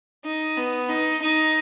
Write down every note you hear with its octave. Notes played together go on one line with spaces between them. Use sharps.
D#4
B3
D#4
D#4